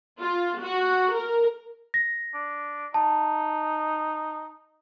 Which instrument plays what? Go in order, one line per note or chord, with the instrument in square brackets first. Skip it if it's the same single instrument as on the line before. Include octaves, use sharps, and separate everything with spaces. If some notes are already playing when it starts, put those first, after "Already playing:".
[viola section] F4
F#4
A#4
[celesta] A#6
[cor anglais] D4
[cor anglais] D#4 [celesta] A5